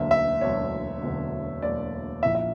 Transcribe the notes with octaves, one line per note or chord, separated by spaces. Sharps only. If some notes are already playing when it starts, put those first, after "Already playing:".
Already playing: E1 D2 D3 F#3 A#3 E5
E5
E1 D2 D3 F#3 A#3 C#5
E1 D2 D3 F#3 A#3
E1 D2 D3 F#3 A#3 D5
A#1 A#2 A#3 E4 E5
E5